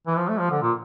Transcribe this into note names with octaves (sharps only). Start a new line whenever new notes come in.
E3
F3
A3
F3
D3
A#2